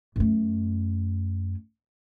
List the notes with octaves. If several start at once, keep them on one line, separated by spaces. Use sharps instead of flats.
F#2 A3